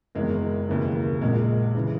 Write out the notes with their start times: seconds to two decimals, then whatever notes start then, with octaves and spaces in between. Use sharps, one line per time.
0.15 F#1 E2 D#3 G#3
0.69 E1 D#2 C#3 E3
1.21 A#1 A#2 G#3
1.75 C#3 E3